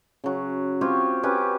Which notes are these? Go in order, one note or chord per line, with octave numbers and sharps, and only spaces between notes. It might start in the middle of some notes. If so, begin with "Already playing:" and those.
C#3 F#3
C4 F4 G4 C#5
C#4 F#4 G4 B4